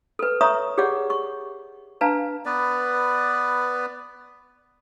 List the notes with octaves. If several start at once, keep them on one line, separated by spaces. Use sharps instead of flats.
A4 B4
C#5 E5 A#5 C#6 D#6
G4 G#4 C#5 D5 F#5
C#6
D4 B4 F5 A5 A#5
B3 B4 D5